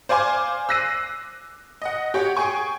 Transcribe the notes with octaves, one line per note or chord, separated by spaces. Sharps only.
C5 D5 F5 G#5 C6 D6
E6 F#6 A#6 C7 D#7
D#5 F#5
G4 C#5 F#5
G#4 G5 G#5 C#6